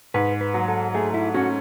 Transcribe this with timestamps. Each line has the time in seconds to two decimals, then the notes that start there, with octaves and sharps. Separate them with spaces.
0.14 G#2 B4
0.41 B4
0.54 F#3
0.68 A4
0.94 A3 G#4
1.14 E4
1.34 C#4 F#4